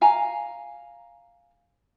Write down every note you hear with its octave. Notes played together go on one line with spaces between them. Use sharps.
F5 G#5 A#5